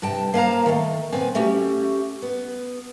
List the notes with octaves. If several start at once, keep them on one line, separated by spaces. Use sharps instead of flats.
G2 C3 G5 A5
A#3 C5 F5 A#5
D#3 A3
A#2 B3 C4 G#5
A3 C#4 F#4 G4
B3